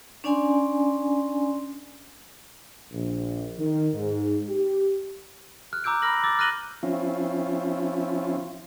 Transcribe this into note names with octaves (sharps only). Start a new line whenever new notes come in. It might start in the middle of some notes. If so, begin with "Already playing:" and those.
C#4 D4 D5 G#5 C6
A#1
D#3
G#2
G4
F6 F#6
A#5 D6 E6 G6 D7
B5 E6 F6 A#6 F#7
D6 E6 A6
F6 F#6 A#6 D#7 F#7 G7
F3 C4 C#4 E4 F4